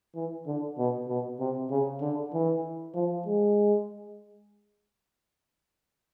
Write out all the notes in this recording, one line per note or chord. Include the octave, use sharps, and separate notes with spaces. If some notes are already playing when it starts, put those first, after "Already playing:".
E3
D3
B2
B2
C3
C#3
D3
E3
F3
G#3